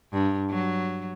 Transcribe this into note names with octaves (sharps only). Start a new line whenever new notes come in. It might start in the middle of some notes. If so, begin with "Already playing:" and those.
G2
F#3